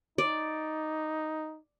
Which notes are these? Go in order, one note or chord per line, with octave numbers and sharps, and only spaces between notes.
D#4 D5